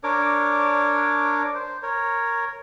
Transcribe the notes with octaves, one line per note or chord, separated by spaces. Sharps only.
D4 A#4 C#5 D6
C5
A#4 C#5